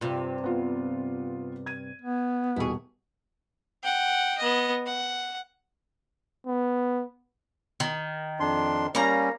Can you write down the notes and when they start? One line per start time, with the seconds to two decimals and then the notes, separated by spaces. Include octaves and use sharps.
0.01 G2 C3 F4
0.44 B3 F4
1.66 G#6 D#7
2.02 B3
2.56 D#1 B2 E4 G#4 C#6
3.84 F#5 G5
4.38 B3 D#5
4.87 F#5
6.47 B3
7.80 D#3
8.40 F2 D4 C6
8.95 G3 A#3 C#4 A#5